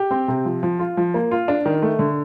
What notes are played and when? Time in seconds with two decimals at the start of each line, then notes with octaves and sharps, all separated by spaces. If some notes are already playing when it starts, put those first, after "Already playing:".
Already playing: G4
0.11 C4
0.28 C3
0.45 F3
0.63 F3
0.79 F4
0.97 F3
1.14 A#3
1.31 F4
1.48 D4
1.66 D#3
1.82 A3
1.99 D3